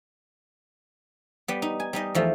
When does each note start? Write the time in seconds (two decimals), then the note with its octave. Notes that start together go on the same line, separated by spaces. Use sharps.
1.48 G3 B3
1.62 D#4
1.80 G#5
1.93 G3 D#4 D#5
2.15 E2 F3 A3